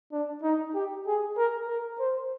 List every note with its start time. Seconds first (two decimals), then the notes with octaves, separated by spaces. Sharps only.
0.12 D4
0.43 D#4
0.75 G4
1.07 G#4
1.37 A#4
1.68 A#4
2.00 C5